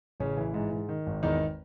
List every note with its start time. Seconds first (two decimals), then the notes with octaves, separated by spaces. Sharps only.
0.20 A1 C#3 C#4
0.37 E3
0.54 G#2
0.72 G#2
0.89 D#3
1.07 G#1
1.23 E2 D#3 D#4